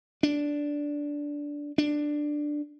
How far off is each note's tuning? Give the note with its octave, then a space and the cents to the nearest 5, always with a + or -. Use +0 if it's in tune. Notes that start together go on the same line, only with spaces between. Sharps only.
D4 -10
D4 +10